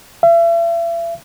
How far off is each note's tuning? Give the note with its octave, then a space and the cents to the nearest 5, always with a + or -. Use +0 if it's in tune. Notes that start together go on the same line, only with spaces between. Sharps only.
E5 +40